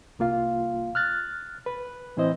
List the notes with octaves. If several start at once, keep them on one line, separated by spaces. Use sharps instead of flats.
C2 A#3 F4 F5
F6 F#6 A6
B4
A2 E3 C4 E4 C5 D#5